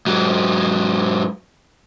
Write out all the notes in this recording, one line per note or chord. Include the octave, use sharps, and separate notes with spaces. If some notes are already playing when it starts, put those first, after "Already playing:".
G#2 F#3